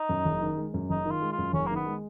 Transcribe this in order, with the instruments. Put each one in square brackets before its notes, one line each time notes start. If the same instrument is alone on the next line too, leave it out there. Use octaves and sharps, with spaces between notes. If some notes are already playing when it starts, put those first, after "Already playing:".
Already playing: [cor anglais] D#4
[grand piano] F#2
F#1
D#3
G#3
F#2
[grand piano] F#1 [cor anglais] D#4
[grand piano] D#3
[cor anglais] F4
[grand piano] G#3
[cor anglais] F4
[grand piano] F#2
[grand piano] F#1 [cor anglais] C#4
[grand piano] D#3 [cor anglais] A#3
[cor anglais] B3
[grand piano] G#3